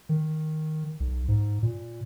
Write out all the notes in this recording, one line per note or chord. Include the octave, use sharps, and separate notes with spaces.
D#3
B1
G#2
A#2